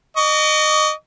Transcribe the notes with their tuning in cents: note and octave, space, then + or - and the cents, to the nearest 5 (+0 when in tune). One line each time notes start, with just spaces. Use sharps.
D#5 -20 C#6 +45